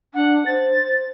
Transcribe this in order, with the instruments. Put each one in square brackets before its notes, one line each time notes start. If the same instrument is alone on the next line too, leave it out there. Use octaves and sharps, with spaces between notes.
[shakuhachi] D4 [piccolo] F#5
[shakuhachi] C5 [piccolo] A6